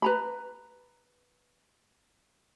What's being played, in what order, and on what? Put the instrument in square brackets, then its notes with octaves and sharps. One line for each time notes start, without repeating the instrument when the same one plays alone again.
[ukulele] B4 A#5 B5